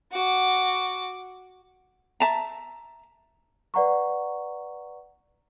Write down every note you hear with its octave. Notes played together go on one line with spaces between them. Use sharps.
F#4 D6
E5 A5 A#5
B4 D5 F#5 A#5 C#6